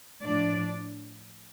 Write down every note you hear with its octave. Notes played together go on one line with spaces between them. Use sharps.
A2 F3 D4 D5